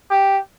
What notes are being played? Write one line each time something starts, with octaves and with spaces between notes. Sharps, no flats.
G4